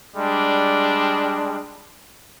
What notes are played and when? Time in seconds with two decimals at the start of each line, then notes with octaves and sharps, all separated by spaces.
0.16 G3 G#3 D4